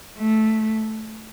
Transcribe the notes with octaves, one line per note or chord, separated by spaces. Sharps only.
A3